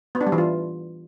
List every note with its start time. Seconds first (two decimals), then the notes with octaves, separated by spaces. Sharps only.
0.15 B3
0.21 D4
0.26 G3
0.32 E3
0.38 F4